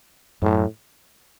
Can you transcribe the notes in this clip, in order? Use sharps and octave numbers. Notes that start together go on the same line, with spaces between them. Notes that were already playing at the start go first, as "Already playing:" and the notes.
F#2 A2